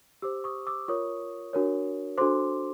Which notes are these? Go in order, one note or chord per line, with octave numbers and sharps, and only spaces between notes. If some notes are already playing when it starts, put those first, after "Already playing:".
G4 C5 D6 E6
C#6 D#6
D6 E6
F4 A#4 C#5 C#6 D#6
D4 F#4 A#4 C#5
D4 F#4 A4 C5 C6 D6